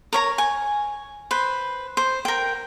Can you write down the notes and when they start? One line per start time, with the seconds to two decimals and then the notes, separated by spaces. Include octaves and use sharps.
0.13 A#4 C#5 A#5
0.38 G#5 C#6
1.31 B4 C5
1.97 C5
2.25 A#4 G5